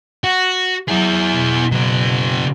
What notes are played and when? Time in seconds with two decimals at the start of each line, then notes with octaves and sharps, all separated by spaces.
0.24 F#4
0.88 F#3 E4 G#4
1.33 B2
1.72 C#3 F#3